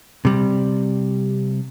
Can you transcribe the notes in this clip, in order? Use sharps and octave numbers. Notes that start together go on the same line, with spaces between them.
C3 G3